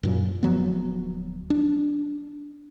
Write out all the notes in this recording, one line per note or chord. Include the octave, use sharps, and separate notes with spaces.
F#2 A#2 F#3
D1 F3 F#3 B3
D4